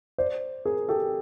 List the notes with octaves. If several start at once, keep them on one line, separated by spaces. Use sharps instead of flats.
C5 D5
G#4 A#4
G4 A4